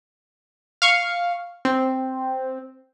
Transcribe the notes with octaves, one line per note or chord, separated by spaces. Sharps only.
F5 C#6
C4